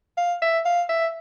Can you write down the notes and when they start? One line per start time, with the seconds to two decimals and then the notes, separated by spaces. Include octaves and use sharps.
0.18 F5
0.42 E5
0.65 F5
0.89 E5